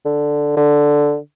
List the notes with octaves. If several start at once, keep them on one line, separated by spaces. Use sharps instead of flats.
D3
D3